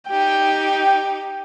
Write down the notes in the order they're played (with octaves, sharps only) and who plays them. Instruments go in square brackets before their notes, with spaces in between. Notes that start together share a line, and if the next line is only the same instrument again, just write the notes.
[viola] D#4 G4 [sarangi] G5